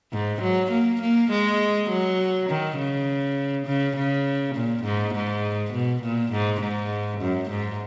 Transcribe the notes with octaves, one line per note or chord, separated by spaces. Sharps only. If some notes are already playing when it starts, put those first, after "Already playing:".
G#2
F#3
A#3
A#3
G#3
F#3
D#3
C#3
C#3
C#3
A#2
G#2
G#2
B2
A#2
G#2
G#2
F#2
G#2